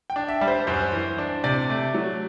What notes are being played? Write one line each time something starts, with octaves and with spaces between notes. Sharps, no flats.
G5
D4
E5
G3
C5
F#2 C5
E3
D4
C3 D5
A3
F#3